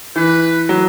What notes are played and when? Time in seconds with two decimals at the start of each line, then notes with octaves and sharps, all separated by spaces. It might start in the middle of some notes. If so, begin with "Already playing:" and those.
0.16 E3 B4
0.69 F#3